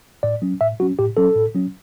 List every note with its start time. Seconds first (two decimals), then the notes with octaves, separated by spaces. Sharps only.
0.23 A2 D5
0.42 F#3 C#4
0.61 A2 E5
0.80 F#3 C#4 F#4
0.99 A2 G4
1.17 F#3 C#4 A4
1.35 A2
1.55 F#3 C#4